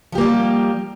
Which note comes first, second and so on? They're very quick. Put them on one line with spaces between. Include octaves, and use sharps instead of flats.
F3 G4 A#3 G3